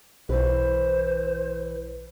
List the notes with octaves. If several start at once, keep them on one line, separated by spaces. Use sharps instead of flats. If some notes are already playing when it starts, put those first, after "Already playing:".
B1 E3 B4 C5